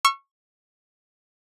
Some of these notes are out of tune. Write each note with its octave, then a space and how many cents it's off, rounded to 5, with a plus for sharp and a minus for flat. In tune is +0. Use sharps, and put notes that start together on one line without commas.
C#6 -15 E6 +40